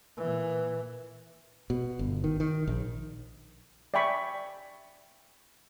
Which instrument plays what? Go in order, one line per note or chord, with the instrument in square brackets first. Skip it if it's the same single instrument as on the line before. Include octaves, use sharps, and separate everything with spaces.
[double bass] A#2 E3
[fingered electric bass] B2
G1
D#3
D#3
A#1
[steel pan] D5 E5 G5 G#5 B5 C#6